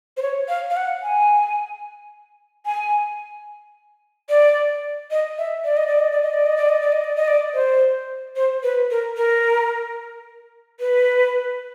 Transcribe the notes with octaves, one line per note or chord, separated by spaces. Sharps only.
C5
C#5
F5
F5
F#5
G#5
G#5
D5
D#5
E5
D5
D#5
D5
D#5
D5
D#5
D5
D#5
D5
D#5
D5
D#5
D5
D#5
D5
C5
C5
B4
A#4
A#4
B4